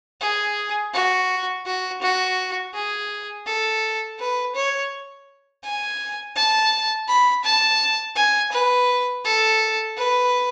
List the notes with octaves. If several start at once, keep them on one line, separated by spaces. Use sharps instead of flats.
G#4
F#4
F#4
F#4
G#4
A4
B4
C#5
G#5
A5
B5
A5
G#5
B4
A4
B4